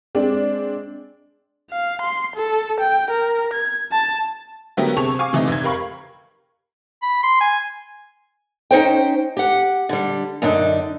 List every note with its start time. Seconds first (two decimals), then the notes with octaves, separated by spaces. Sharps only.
0.15 G#3 C4 D4
1.71 F5
2.02 C6
2.36 A4
2.80 G5
3.11 A#4
3.54 G#6
3.92 A5
4.77 D3 F#3 A3 B3 G4 A#4
4.97 C3 G#4 A5 C#6 F7
5.19 F5 G#5 C#6 D6
5.33 C3 E3 A3 D#4
5.48 F1 G#6
5.64 G4 A#4 F5 B5 C#6
7.03 B5
7.23 C6
7.41 G#5
8.71 C#4 D#4 C5 G5
9.37 G4 F#5
9.89 D3 G3
10.42 F#2 D3 D4 D#4